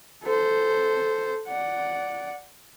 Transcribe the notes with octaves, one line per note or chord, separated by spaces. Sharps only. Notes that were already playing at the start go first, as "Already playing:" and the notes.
A4 C5
D5 F#5